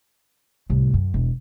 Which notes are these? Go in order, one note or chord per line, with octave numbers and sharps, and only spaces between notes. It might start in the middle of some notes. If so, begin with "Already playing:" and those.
C2 A2
F#2
E1